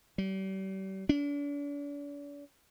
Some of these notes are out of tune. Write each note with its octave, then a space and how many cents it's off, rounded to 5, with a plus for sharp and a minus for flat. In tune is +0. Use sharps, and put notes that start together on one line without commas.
G3 -40
D4 -40